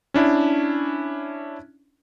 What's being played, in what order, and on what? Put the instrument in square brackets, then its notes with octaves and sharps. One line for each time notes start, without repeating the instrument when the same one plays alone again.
[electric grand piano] C#4 D4 E4